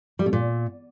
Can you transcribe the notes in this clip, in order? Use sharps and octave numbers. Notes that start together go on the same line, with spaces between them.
G3
B2
A#2